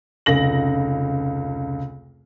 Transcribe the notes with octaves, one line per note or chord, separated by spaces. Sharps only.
F1 C#2 A#6 F#7